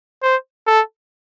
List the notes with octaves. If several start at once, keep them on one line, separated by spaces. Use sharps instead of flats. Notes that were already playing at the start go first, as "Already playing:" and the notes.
C5
A4